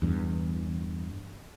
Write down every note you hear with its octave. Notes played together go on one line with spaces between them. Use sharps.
E2 G2